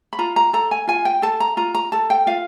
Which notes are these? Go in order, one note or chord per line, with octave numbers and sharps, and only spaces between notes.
B5
F4 A#5
A#5
A4 A#5
G#5
F4 G#5
G5
A4 A5
A#5
F4 A#5
A#5
A4 A5
G5
F4 F5